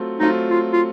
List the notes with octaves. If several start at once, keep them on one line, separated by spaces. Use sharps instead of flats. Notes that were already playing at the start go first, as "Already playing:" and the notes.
Already playing: F#3 A3 C4 F4
F#3 A3 C4 D#4 F4
F4
F4